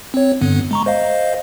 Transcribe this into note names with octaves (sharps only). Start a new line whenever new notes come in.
C4 C#5
G2 D3 B3
G#3 A#5 C#6
C5 D#5 F5